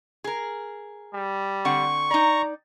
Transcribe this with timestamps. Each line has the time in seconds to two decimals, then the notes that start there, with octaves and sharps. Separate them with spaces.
0.24 G#4 A#4
1.14 G3
1.65 D3 C4 F#5 C#6
2.11 D#4 D5 A#5